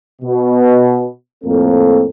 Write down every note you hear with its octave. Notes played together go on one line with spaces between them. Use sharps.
B2
F2 A2 A#3 C4 A4